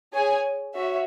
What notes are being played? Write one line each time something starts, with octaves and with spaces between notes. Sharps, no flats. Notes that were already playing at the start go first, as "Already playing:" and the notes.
G#4 C#5 G#5
F#4 C#5 E5